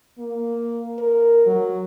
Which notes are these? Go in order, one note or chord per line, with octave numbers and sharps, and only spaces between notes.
A#3
A#4
F#3